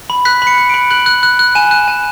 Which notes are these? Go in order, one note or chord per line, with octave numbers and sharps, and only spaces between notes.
B5
F#6 B6
B5
C#7
F#6
D7
B5
F#6 F#7
F#6
F#6
F#6
G#5 E7
F#6
G#5